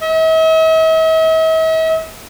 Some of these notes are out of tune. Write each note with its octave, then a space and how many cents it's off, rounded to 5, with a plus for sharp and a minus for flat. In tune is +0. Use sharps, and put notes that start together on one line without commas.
E5 -45